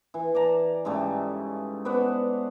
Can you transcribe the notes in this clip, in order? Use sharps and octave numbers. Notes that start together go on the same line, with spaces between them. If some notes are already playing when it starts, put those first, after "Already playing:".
E3
D5 A5 A#5
G#2 C#3 G3 A3
B3 C5 D5 F#5